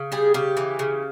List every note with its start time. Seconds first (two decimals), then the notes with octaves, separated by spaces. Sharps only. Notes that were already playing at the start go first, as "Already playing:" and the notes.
Already playing: C#3
0.12 G3 G#4
0.34 C#3 G4
0.57 E3
0.79 C#3